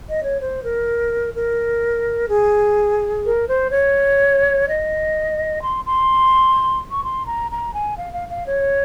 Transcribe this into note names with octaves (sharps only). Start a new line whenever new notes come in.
D#5
C#5
C5
A#4
A#4
G#4
A#4
C5
C#5
D#5
C6
C6
C#6
C6
A#5
A#5
G#5
F5
F5
F5
C#5